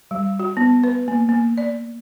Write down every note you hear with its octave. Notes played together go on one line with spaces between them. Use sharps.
G3
F#4
B3
B4
A#3
A#3
D5